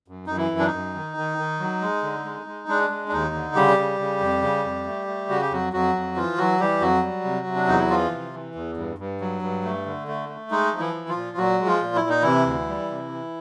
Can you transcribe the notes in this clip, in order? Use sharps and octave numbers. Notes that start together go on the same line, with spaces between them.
F#2
F#2 D#4
E3 E4
F#2
D4
D#4
F#2
D#3
D#3
D#3
F#3
G#3
D3
G#3
G#3
G#3 D4
G#3
D4
D#2 D#4
D3
C#3 G3 G4
C#3
C#3
F2
C#3
F2
A3
A3
C#3 F#4
G4
F2 F#3 F#4
F2 F#3 F#4
F2
E3 F3 F4
E3 F#3 F#4
E3 G3 G4
F2 F#3 F#4
G3
C3
C3
D4
E2 D#4
E4
E3 F3 F4
C3
E3
E2
G2
G2
F#3
G2
A3
D3
A3
A3
G#3 D#4
F3
E3 E4
F3
F3 F4
A#2
A#2 F#3 F#4
G#3
F3 F4
A#2
E4
A#2
D#4
C3 E3 E4
D2
G3
C3
E3